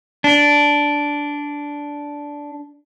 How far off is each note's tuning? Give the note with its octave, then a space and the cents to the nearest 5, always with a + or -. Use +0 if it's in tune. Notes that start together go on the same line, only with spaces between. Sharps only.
D4 -10